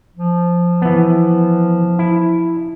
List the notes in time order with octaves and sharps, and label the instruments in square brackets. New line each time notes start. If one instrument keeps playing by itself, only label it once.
[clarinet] F3
[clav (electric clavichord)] E3 B3
E4